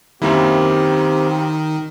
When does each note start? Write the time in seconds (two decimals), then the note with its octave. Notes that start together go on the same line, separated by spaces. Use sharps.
0.22 F#2 D#3 A#3 C4 E4 G4